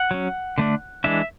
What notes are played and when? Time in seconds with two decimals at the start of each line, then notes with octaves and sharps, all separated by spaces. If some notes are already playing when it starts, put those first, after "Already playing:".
Already playing: F#5
0.11 F#3 C#4
0.58 D3 A3 D4
1.04 E3 G#3 D4 E5